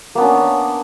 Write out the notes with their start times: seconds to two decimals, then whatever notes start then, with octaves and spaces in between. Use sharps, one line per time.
0.15 A#3
0.18 B3
0.20 D4
0.23 C#4